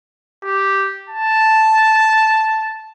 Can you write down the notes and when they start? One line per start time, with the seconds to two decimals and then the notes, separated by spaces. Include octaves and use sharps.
0.44 G4
1.09 A5